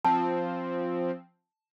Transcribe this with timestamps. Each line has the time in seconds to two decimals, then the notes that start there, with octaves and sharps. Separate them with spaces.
0.05 F3 C4 A5